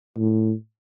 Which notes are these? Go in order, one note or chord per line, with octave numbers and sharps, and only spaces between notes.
A2